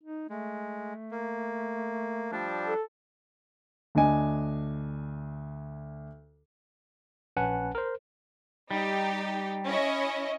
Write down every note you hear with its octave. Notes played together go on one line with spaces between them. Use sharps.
D#4
G#3 A3
A#3
F3 G3 D4
A4
D2 D4 D#5 G#5
A#1 C#4 B4 F#5 G#5 A5
A#4 C5
G3 D#4 G4
C#4 E4 D#5